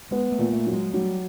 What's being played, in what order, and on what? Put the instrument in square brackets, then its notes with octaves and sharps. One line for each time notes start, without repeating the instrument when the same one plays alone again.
[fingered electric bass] G#3 [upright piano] B3
[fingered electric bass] A3
[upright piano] A#2
[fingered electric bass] A3
[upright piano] F#3
[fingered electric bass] G#3
[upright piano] F#3 [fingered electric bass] G3